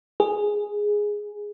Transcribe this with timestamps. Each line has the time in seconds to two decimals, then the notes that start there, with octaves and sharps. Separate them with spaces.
0.20 G#4